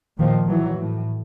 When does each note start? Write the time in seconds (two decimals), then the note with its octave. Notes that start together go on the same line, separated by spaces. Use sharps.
0.19 A#2 D#3 F3
0.47 A#2 E3 F#3
0.76 A2